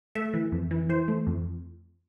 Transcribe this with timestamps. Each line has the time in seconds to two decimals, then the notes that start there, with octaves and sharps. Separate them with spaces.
0.15 A3 E5
0.34 E3
0.52 F2
0.71 E3
0.89 E3 C5
1.08 A3
1.27 F2